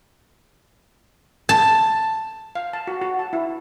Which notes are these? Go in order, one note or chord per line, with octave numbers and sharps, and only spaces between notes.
A5
F5
A5
F#4
F#4
A5
E4